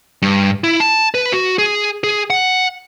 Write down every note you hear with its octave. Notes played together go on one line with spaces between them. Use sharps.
G2
E4
A5
B4
F#4
G#4
G#4
F#5